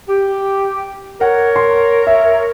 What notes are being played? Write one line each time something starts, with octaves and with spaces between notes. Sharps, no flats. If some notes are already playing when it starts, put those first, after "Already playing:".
G4
A#4 C#5 F#5
C6
E5